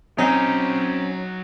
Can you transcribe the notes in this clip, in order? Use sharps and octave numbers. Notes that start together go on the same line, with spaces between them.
F#3 C4 C#4 D#4 D#5